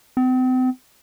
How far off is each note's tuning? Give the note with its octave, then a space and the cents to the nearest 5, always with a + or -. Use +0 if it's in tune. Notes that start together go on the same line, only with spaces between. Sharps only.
C4 -40